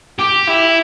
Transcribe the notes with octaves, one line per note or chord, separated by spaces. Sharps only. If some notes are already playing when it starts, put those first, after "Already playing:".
G4
E4